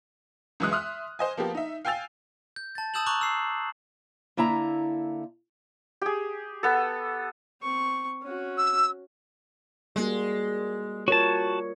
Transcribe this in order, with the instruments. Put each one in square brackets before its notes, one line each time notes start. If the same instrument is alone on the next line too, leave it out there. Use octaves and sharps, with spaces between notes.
[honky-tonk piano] C#2 F#2 E3 G#3 D#6 F#6
E5 C6 D#6 F6 F#6
C5 D#5 G#5
F3 A#3 B3 G4
D#4 E5
F5 G5 G#5 E6 A6 F7
[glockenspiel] G6
A5 A6
A5 D#6 E6 G6 E7 F#7
A#5 C#6 D6 F#6 F#7
E6 C7
[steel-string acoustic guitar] D3 A#3 E4 E5 A#5
[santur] G4 G#4
B3 A4
[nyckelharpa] C4 C#6
C#4 F#4
[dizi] E6
[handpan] G3 A#3 F#4 [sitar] G#3
[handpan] F4 A#4 C#5 [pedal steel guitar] F#4 A5